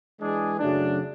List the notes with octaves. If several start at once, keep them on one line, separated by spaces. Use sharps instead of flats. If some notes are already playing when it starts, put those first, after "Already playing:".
E3 G#3 D4 G#4
F#2 C#3 F#3 A3 D4